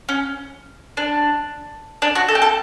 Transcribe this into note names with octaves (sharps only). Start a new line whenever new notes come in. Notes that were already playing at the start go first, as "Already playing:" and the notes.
C#4
D4
D4
F#4
A4
G4
A4